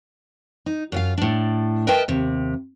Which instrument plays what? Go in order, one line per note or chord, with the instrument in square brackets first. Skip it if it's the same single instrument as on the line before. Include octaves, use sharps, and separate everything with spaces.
[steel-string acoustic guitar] D#4
F#2 F4 F5
A2 D4
A#4 B4 D#5 E5 G5 A5
D#2 C3